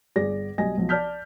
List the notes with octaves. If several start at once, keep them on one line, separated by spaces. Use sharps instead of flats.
G1 G#4 D5 A#6
B1 G3 D#5 G#5 A#6
B1 F3
D5 A5 F6 G6 B6